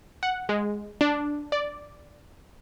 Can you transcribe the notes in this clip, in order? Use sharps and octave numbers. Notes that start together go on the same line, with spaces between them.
F#5
G#3
D4
D5